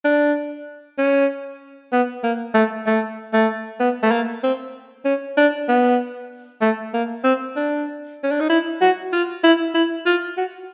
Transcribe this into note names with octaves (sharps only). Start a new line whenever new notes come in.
D4
C#4
B3
A#3
A3
A3
A3
B3
A3
A#3
C4
C#4
D4
B3
A3
A#3
C4
D4
C#4
D4
D#4
E4
F#4
F4
E4
E4
F4
F#4